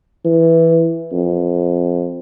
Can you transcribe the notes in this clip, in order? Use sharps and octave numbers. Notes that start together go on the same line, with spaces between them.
E3
F2